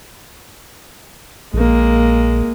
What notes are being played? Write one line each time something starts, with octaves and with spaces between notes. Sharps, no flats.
A#1 G#3 A#3